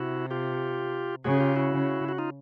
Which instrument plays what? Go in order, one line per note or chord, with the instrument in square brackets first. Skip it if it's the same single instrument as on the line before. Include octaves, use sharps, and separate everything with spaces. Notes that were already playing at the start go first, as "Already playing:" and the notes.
Already playing: [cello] C3 [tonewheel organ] E4 F#4
[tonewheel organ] F4 G4
[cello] C#3 [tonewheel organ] F#4 G#4
[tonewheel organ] F4 G4
E4 F#4
[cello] C#3
[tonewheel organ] F#4
D#4 F4